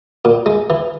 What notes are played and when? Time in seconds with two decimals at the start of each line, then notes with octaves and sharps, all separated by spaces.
0.25 A#2
0.46 G#3
0.70 E3